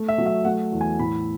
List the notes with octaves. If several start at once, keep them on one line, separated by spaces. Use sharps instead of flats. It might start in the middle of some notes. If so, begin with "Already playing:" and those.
Already playing: A3
E5
F#3
E5
A3 F#5
E2
G#5
A2 B5